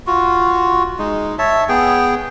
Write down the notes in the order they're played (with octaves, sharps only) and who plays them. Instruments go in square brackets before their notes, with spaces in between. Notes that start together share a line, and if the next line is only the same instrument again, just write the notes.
[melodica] F4 F#4
G#3 D#4
C#5 E5 A5
B3 G#4 G5